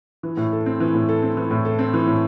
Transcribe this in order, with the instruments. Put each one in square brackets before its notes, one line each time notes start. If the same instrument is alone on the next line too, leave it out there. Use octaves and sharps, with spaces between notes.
[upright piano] E3
A2
A4
C4
E3
A2
A4
C4
E3
A2
A4
C4
E3
A2